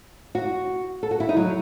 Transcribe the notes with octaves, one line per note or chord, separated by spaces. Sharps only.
F#4
A4
F#4
E4
D#4
F#3